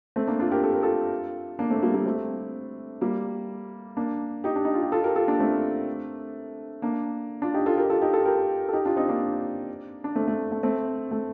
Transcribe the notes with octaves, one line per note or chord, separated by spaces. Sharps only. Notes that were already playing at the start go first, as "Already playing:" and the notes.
A3 C4
A#3 D4
D4 F4
G4 A#4
A4
A#4
F4 A4
A#3 D4
A3 C4
G3 A#3
G3 A#3
A3 C4
G3 A#3
A#3 D4
D#4 G4
D4
D#4
F4
G4
F4 A4
G4 A#4
F4 A4
A#3 D4
A3 C4
A#3 D4
D4 F4
D#4 G4
F4 A4
G4 A#4
F4 A4
D#4 G4
F4 A4
G4 A#4
A4
D#4 G4
D4 F4
C4 D#4
A#3 D4
D4
A3 C4
A3
A3
A3 C4
A3